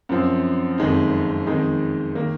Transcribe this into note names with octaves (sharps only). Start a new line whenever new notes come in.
F#2 F3 C4
F#1 F2 D#3 G#3 D#4
F2 D#3 G#3 D#4
D#3 A#3